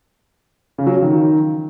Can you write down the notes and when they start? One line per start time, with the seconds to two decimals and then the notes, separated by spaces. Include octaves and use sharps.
0.78 C#3
0.86 F#3
0.94 F3
1.03 D#3